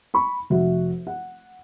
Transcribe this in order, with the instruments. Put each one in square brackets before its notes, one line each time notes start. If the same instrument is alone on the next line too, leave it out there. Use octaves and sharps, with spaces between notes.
[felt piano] B5 C#6
F1 F#4 E5
F#5